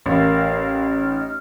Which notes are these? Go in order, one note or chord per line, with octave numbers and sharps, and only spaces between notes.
A1 A#4 F5
D#4 F6